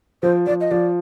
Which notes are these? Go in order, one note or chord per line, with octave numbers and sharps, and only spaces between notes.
F3 C5
F3 D5
D#5
F3 D5